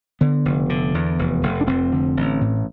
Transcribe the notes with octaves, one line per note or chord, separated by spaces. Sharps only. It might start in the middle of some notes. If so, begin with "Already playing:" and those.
D3 B3
F1
D3
E2
F1
F1
D4
F1 C4
D3
A1
A2